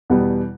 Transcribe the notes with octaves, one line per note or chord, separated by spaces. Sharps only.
E2 B2 G3 B3